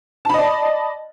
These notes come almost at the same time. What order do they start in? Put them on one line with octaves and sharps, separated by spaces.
A5 B5 D#5 D5